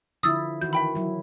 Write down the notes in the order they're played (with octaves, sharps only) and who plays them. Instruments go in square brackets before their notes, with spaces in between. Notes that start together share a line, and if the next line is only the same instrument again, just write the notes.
[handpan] D3 F3 E4 [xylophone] D#6 E6 A6
[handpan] D#3 E3 F#4 [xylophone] G6
[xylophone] E5 G5 B5
[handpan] F#3 E4